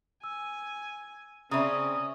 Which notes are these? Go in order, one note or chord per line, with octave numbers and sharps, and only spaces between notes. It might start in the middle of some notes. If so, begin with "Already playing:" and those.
G#5 E6
C#3 C4 C#4 D5 E5 A#5 D#6